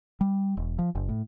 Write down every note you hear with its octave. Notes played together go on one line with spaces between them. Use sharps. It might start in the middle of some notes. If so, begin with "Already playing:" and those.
G3
E1
F3
F#1
A2